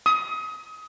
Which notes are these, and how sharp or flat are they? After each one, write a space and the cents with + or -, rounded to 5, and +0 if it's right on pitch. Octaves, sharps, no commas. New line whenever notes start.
D#6 +25